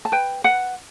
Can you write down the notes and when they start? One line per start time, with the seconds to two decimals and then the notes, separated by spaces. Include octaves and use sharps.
0.05 A5
0.12 B4 G5
0.44 B4 F#5